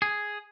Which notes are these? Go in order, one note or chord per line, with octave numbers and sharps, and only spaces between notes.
G#4